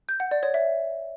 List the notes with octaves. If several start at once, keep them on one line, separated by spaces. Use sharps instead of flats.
G6
F#5
D5
C#5
E5